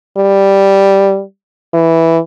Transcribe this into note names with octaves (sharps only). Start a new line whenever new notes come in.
G3
E3